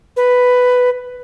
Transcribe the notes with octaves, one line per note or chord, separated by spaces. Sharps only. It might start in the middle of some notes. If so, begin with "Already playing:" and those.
B4